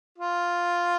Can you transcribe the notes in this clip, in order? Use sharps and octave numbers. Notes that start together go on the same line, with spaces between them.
F4